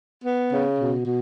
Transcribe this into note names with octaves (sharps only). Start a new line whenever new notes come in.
B3
C#3
B2
B2